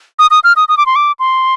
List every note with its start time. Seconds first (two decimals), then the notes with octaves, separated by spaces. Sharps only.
0.19 D#6
0.31 D#6
0.44 F6
0.56 D#6
0.68 D#6
0.78 D6
0.86 C6
0.96 D6
1.19 C6